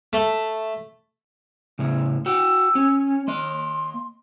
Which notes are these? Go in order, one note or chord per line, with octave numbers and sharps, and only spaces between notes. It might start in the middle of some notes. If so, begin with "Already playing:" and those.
A3
A2 C#3
F#4 G5 E6
C#4
A#3 D#5 C6